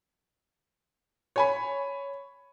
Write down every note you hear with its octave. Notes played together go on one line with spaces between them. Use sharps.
C#5 G#5 B5